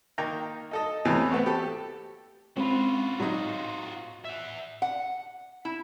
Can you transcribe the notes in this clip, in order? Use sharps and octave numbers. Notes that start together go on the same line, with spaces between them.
D#3 A#3 G5 A#5
D#4 A4 D#5
E2 A2 C3 E3
A3 B3 C4
G4 A4
G#3 C4 C#4 F4 F#4 B5
A2 F#3 D#4
E5 F#5
F#5
E4